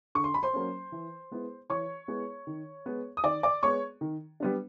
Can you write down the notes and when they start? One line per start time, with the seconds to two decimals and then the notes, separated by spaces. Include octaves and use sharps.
0.15 D3 C#6
0.24 C6
0.34 B5
0.43 C5 C6
0.53 F#3 A#3 C#4
0.92 E3
1.31 G#3 B3 E4
1.70 E3 C#5 C#6
2.08 G#3 B3 E4
2.47 D#3
2.86 G#3 B3
3.17 D#6
3.24 D#3 D5 D6
3.43 D5 D6
3.63 G#3 B3 C#5 C#6
4.01 D#3
4.40 G3 B3 D4